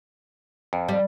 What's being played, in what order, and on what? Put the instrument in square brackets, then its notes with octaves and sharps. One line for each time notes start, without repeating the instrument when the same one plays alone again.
[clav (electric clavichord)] F2
[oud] G3